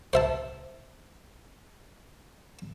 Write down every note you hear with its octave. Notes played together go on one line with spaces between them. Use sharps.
C5 E5 A5